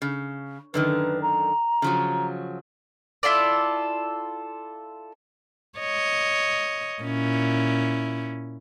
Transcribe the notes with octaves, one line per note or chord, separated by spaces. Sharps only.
C#3
F#2 D3 D#3 B4
A#5
C#3 F3 F#3
E4 F4 A4 D5
C#5 D#5
A#2 C#4 E4